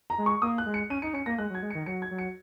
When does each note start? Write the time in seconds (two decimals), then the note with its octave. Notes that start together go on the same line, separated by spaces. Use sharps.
0.10 A#5
0.18 G#3
0.26 C#6
0.42 A#3 D#6
0.58 F#6
0.66 G#3
0.74 C#7
0.90 C#4 D#7
1.02 D#4 C#7
1.14 C#4 C#7
1.26 A#3 A#6
1.38 G#3 F#6
1.50 F#3
1.55 G#6
1.62 G#3
1.70 D#3 C#7
1.86 F#3 C#7
2.02 G#6
2.11 F#3
2.18 C#7